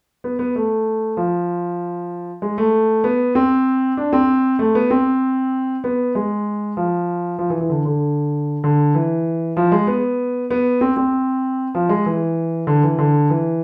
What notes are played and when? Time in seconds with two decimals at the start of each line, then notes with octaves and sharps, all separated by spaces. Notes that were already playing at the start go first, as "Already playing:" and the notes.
0.24 B3
0.39 B3
0.56 A3
1.17 F3
2.42 G#3
2.58 A3
3.04 B3
3.35 C4
3.97 D4
4.13 C4
4.59 A3
4.75 B3
4.90 C4
5.84 B3
6.15 G#3
6.77 F3
7.38 F3
7.50 E3
7.60 E3
7.70 D3
7.85 D3
8.64 D3
8.95 E3
9.57 F3
9.72 G#3
9.87 B3
10.50 B3
10.81 C4
10.97 C4
11.75 F3
11.89 G#3
12.06 E3
12.67 D3
12.83 E3
12.98 D3
13.30 E3